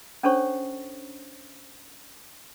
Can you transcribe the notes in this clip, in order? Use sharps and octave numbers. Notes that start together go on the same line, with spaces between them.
C#4 D4 A4 C5 C#5 C#6